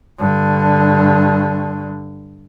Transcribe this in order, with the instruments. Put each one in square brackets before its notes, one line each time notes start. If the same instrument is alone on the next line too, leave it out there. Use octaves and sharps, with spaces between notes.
[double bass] G2 D3